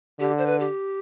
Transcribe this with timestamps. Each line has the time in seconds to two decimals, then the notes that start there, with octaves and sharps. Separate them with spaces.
0.20 D3 G4
0.38 C5
0.46 B4
0.60 G4